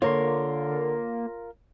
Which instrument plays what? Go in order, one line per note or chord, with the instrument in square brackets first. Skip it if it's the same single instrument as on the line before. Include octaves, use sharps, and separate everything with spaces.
[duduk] D3 [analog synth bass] A#3 [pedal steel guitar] F4 A#4 C6 [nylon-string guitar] C#5